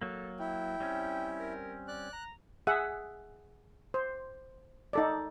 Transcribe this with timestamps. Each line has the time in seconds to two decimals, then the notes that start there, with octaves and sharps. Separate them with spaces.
0.02 F#3 A#3 A4
0.40 E4 G5
0.80 G3 C4 C#4
1.39 A#4
1.88 D5 F#6
2.13 A#5
2.67 G#4 E5 F#5
3.94 C5
4.93 D#4 A4 D5